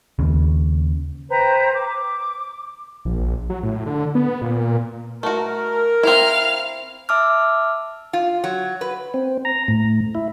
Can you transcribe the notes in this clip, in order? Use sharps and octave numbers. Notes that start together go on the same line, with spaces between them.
D#2 C#3
B4 C5 G5 A#5
D6
A#1
F#3
A2
D3
B3
A#2
A3 F#4 A#4
C4 E4 F5 F6
E5 A5 D6 E6 F6
F4
F#3
B4
C4
A#5
A2
E4